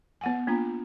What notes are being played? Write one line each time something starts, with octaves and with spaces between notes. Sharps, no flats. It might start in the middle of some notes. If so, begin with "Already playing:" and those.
B3 F#5 G#5
A#3 D4 F4 A#5